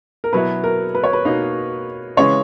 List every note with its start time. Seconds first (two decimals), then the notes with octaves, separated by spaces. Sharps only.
0.24 A#4
0.33 B2 F#3 B3 E4 B4
0.64 A#4
0.95 B4
1.04 C#5
1.13 B4
1.25 B2 A#3 D#4
2.17 C#3 E3 G#3 C#4 C#5